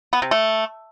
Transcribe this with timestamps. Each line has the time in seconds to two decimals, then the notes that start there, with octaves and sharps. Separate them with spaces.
0.13 B3
0.22 C3
0.31 A3